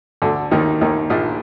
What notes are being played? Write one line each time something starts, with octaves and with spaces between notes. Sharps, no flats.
D2 D3
D#2 D#3
D#2 D#3
A#1 A#2